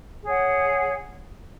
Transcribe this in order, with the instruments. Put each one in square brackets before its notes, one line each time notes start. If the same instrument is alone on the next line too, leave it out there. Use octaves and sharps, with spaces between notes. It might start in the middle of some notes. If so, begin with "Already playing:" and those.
[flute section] G#4 C#5 F#5